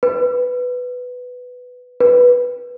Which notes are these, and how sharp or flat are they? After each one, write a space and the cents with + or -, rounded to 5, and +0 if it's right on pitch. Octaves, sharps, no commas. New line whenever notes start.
B4 +5
B4 -10